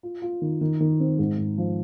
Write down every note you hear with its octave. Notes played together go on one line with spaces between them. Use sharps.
F4
F4
D#3
D#3
D#3
C4
G#2
G#2
F3